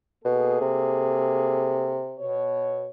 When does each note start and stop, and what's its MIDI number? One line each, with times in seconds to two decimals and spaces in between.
0.25 0.59 47
0.25 2.02 58
0.25 2.02 68
0.25 2.02 69
0.61 2.25 48
2.18 2.89 47
2.18 2.89 73